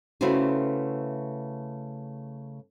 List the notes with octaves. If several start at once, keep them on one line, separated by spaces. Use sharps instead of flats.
C#3 A3 E4 F#4 B4 C5